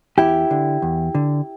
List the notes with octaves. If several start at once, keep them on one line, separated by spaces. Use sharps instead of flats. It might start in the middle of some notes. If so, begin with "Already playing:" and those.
E2 E4 G4
D3
E2
D3